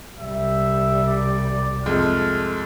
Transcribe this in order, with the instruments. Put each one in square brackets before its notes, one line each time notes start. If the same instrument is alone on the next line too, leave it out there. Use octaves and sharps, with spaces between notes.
[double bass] C2 G3 [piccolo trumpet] E5
[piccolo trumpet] D5
[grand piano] F2 G#3 A3 [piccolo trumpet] F6